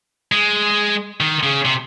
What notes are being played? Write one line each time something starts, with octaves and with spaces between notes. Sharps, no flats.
G#3
D#3
C#3
C3